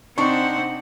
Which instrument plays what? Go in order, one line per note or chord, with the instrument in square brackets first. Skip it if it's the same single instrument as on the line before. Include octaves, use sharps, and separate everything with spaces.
[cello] C3 F#5 [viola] C4 [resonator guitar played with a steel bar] D4 [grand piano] D#4 C#6